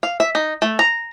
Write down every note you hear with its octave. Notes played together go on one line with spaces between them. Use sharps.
F5
E5
D#4
A3
A#5